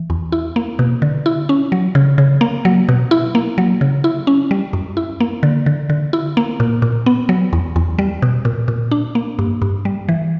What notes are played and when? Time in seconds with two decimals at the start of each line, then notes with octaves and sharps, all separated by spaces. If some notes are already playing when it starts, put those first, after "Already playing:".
Already playing: E3
0.10 E2
0.32 E4
0.56 A#3
0.79 B2
1.02 D3
1.26 E4
1.49 C#4
1.72 F#3
1.95 C#3
2.18 C#3
2.41 A#3
2.65 F#3
2.89 B2
3.11 E4
3.35 A#3
3.58 F#3
3.81 C#3
4.04 E4
4.27 C#4
4.51 G3
4.73 F#2
4.97 E4
5.20 A#3
5.43 D3
5.66 D3
5.90 D3
6.13 E4
6.37 A#3
6.60 A#2
6.82 A#2
7.06 B3
7.29 F#3
7.53 E2
7.76 E2
7.99 G3
8.22 B2
8.45 A#2
8.68 A#2
8.91 D4
9.15 A#3
9.39 G2
9.62 G2
9.85 G3
10.09 E3